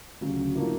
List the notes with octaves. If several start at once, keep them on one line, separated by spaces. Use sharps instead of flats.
D2 C#3 F#3
A2 F#3 A#3 D4 F4